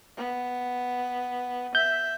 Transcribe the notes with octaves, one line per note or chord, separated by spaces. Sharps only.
B3
E5 G6